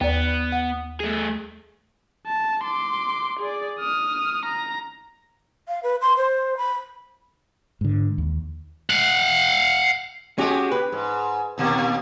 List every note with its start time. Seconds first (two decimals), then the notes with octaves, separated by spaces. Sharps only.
0.01 D#2 B3 D5
0.52 F#5
1.00 A3 G#4
2.27 A5
2.64 C6 D6
3.40 G#4 D5
3.80 D#6 F6
4.46 A#5
5.68 F5
5.83 B4
6.01 C6
6.17 C5
6.57 B5
7.81 G#2 D3
8.18 D#2
8.90 F5 F#5
10.38 G#3 C#4 F#4 G4
10.72 B4
10.92 G#2
11.58 D#2 A#2 A#3